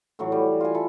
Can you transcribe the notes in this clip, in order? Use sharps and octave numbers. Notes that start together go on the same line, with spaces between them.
A2 E3 F#3
G3
F4 F#5 G#5
E4 A4